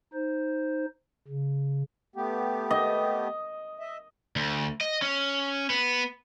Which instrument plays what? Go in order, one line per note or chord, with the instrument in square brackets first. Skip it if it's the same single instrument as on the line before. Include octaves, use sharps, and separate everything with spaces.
[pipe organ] D#4 C5
C#3
[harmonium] A3 B3 G4
[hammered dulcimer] D#5
[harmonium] D#5 E5
[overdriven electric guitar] D2
D#5
C#4
B3